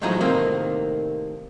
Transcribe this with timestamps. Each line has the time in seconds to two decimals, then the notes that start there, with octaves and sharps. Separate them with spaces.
0.01 E2 A2 F3 F#3 G#3 D#4
0.20 A2 C3 D#3 A#3 C4